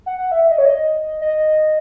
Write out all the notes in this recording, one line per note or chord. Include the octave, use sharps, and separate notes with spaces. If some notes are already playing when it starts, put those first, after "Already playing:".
F#5
F#5
E5
E5
D#5
C#5
D#5
D#5